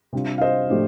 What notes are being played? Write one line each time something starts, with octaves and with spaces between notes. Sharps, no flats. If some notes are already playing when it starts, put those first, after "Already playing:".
C3 G3 D4 F4
F5
C5 D#5
A2 F3 A3 D4 G4